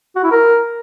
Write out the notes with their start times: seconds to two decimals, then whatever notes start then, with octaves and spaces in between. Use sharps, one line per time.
0.16 F#4
0.24 E4
0.31 A#4